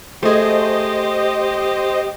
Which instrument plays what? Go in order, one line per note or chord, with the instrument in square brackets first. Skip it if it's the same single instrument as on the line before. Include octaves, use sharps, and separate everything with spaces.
[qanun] A3 G#4 [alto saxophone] G4 [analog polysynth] C5 D#5